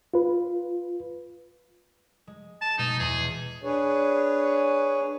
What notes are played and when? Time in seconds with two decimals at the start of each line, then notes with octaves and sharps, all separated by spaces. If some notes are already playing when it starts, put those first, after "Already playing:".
0.14 F4 B4
2.27 G#3
2.61 A5
2.78 B2 G#3 D#4
3.00 E2 G#4
3.63 D4 G#4 B4 C#5